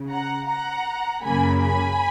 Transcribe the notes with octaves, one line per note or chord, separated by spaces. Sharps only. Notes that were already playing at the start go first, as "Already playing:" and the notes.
Already playing: C#3
F#5 A#5
F#5 A#5
F#2 C#3 F#3 A#3 G#5 B5
G#5 B5